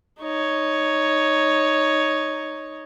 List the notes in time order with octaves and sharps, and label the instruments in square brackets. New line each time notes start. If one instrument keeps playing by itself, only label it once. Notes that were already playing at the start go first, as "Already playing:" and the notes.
[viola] D#4 C#5